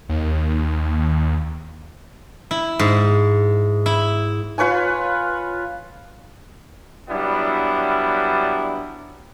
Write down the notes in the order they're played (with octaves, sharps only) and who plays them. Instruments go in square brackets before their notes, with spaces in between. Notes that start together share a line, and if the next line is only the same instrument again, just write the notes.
[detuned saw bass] D#2
[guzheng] E4
G#2
E4
[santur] F4 B4 C#5 G#5
[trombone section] F#3 G3 B3 D4 E4